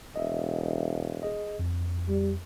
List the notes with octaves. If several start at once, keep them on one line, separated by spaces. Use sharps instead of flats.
E1 D#5 E5
G#4 D#5
F2
G3